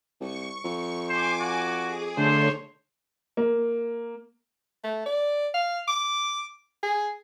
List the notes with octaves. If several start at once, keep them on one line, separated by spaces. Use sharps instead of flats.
C2 C#6
F2
C5 G#5 D6
F#4
G#4
D3 A3 C5 C#5
A#3
A3
D5
F5
D6
G#4